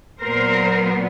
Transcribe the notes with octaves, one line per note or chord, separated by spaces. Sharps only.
A#2 F#3 B3 A#4 C5